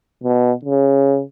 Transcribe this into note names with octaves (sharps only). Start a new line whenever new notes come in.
B2
C#3